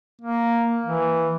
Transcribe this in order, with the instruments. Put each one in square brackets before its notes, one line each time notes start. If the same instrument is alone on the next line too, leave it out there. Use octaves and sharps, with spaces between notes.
[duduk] A#3
E3